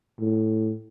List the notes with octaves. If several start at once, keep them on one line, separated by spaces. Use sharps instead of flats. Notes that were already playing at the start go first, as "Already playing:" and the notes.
A2